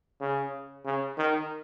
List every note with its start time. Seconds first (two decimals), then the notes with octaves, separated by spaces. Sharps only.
0.21 C#3
0.85 C#3
1.18 D#3